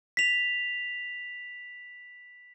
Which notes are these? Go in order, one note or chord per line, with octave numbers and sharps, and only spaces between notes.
B6 F7